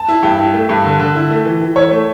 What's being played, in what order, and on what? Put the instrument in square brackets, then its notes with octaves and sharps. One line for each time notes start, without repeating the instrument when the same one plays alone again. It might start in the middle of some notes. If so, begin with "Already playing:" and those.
Already playing: [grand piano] A5
[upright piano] E4
[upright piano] G2 [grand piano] G5
[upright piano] E4
A3
G2
D3
D3
E4
A3
E3
E3
[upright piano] E4 [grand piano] C#5
[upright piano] A3